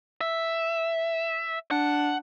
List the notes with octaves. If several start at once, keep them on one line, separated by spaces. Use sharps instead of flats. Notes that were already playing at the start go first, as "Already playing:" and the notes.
E5
D4 F#5